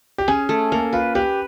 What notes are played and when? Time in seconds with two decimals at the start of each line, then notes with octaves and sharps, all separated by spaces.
0.18 G4
0.28 C#4 G#4
0.49 A3
0.72 A#3 A4
0.93 F4 B4
1.15 G4 B4